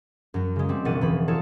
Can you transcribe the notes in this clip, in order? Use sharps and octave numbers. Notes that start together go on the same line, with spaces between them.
F#2 F#3
C#3 G#3
G3 C4
E1 A#1 F#5 A6 D#7
E2 E3 B5
D#4 F4 A4 C#5 A5